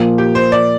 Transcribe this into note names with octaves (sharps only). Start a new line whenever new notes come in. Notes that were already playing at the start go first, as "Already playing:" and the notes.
Already playing: A#2 F3 A#3
G4
C5
D5